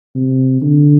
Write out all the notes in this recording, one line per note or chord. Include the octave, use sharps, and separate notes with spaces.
C3
D3